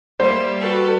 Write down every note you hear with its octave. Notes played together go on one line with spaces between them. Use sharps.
G3 A#3 C5 E5
F#4 A4 B4